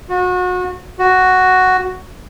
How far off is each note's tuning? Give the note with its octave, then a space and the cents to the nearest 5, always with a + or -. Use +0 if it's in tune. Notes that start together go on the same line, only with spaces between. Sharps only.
F#4 -30
F#4 +5